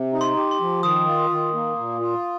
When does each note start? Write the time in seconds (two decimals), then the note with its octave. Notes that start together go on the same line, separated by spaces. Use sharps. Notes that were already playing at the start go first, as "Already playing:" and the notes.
Already playing: C3
0.13 D#4
0.21 C6
0.36 G4
0.51 C6
0.60 F3
0.83 D#3 D#6
1.06 F4
1.30 D#3
1.54 A#3
1.77 A#2
2.00 F4